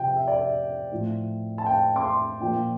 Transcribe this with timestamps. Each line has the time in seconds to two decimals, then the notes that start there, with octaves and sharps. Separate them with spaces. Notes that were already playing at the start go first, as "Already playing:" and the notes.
Already playing: C3 F3 G5
0.16 E5
0.28 D5
0.37 E5
0.92 A2 F3
1.58 A5
1.66 G5
1.96 D6
2.04 C6
2.40 A#2 F3 G5